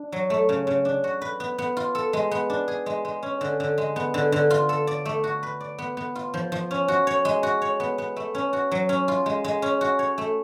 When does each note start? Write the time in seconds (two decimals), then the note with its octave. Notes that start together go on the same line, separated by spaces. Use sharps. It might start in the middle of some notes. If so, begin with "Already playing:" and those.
Already playing: D4
0.12 F#3
0.30 A3
0.49 C#3
0.67 C#3
0.85 D4
1.04 F#4
1.22 B4
1.40 B3
1.58 B3
1.77 F4
1.95 A4
2.13 G#3
2.31 B3
2.50 D4
2.68 G#4
2.86 G#3
3.05 G#3
3.23 C#4
3.41 D3
3.60 D3
3.78 G#3
3.96 B3
4.14 D3
4.32 D3
4.50 F4
4.69 A4
4.87 D5
5.05 A3
5.24 F#4
5.43 B4
5.60 D5
5.78 B3
5.97 B3
6.15 F4
6.34 F3
6.52 F3
6.71 C#4
6.88 F#4
7.07 C#5
7.25 G#3
7.43 F#4
7.62 C#5
7.80 B3
7.98 B3
8.16 A3
8.35 C#4
8.53 F#4
8.72 F#3
8.89 C#4
9.08 F4
9.26 G#3
9.44 G#3
9.62 C#4
9.81 F#4
9.99 C#5
10.18 A3